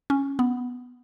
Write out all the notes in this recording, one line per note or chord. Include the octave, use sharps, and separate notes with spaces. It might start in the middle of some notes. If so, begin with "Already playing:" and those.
C#4
B3